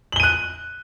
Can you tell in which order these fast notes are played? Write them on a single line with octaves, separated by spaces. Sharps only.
F#7 G7 D#7 F#6